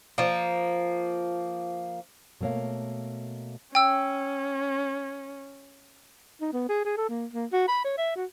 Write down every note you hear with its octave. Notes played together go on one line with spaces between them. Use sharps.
F3 A#3
B2 A3 A#3 C#5 F5
C#4 G5 E6
D#4
B3
G#4
G#4
A4
A#3
A#3
F#4
B5
C#5
E5
F#4